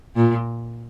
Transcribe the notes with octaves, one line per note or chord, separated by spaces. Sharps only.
A#2